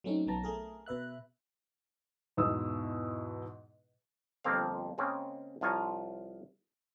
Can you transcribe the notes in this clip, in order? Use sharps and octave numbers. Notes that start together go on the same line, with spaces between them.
F#3 A3 C4 C#4 D#4
B1 F#3 B3 A5 A#5
A3 G#4 A#4
B2 B4 E5 F#6
E2 G#2 B2 G#3 D#6 E6
G1 F2 F3 A#3 C4 F5
C#3 G#3 A#3 C4 C#4
C2 F3 F4 C#5 G#5 A#5